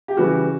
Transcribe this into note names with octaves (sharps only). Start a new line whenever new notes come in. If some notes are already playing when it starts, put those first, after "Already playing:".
G4
C#3 E3 G3 F#4